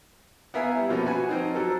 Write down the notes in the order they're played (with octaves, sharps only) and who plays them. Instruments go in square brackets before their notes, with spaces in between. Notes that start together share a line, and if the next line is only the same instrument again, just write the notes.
[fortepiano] B3 A#4 E5 F5 G#5
G3 E4
B2 F3 A#3 C#4
F#4 B4 G#5
F3 C4 D#4
F#3 A4 A#4